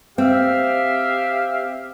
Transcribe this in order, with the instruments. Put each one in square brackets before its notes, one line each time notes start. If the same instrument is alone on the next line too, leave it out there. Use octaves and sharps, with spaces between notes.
[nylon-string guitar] C4 [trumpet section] G4 E5 F5